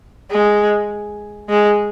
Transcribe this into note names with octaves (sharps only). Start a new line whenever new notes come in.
G#3
G#3